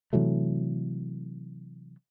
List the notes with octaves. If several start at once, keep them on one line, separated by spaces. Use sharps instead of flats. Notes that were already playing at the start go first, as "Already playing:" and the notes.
C3 E3 F#3 A3